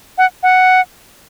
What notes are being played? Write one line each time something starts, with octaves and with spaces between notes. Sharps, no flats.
F#5
F#5